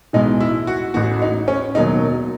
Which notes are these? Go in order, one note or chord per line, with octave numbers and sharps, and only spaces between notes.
B1 A2 E3 G#3 D#4
E4
F#4
A1 A2 E3 F#4
D#4
C#4
E1 D#2 D#3 F#3 D#4